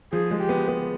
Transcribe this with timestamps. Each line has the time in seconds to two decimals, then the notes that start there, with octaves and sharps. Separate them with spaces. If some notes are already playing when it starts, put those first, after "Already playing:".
0.12 F3 G#4
0.31 G#3
0.40 G4
0.49 B3
0.68 B3